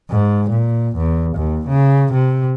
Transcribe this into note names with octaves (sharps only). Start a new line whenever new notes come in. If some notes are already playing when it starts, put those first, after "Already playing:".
G#2
A#2
E2
D#2
C#3
C3